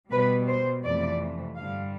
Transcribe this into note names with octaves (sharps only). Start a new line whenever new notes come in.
B2 G3 B4
C5
F2 C3 E3 A3 D5
G2 D3 G3 F5